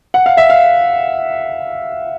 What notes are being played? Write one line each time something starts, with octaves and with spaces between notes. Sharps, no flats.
F#5
F5
E5
F5